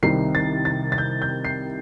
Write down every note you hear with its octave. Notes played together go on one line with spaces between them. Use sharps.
C2 C3 D#3 G3 C7
A6
A6
A6
G6
G6
C7